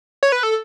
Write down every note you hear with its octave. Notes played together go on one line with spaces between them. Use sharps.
C#5
B4
A4